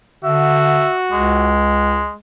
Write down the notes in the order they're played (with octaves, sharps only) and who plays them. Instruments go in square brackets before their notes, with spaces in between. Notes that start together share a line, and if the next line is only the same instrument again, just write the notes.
[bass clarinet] D3 [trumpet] F#4 [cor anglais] E5
[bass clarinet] C#2 [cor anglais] G#3